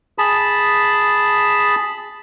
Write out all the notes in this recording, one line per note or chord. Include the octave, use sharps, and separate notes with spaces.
G#4 A5 B5